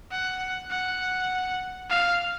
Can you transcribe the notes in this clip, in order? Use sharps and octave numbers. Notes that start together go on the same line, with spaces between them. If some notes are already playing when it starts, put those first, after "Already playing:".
F#5
F#5
F5